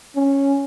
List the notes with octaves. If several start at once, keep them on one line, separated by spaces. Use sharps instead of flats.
C#4